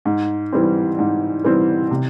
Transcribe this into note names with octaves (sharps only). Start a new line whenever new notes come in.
G#2
E3 G3 C4
G#2
E3 G3 C4
C3